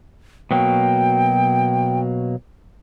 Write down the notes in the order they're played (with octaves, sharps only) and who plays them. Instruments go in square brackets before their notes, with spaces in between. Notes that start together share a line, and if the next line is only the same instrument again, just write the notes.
[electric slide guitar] B2 F#3 A#3 [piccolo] G5